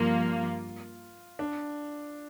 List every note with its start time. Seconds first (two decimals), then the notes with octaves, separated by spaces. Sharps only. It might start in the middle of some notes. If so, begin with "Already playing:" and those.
Already playing: G2 F3 A#3 F4
1.39 D4